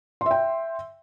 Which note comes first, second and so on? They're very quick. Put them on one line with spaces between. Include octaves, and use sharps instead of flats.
C6 E5 G5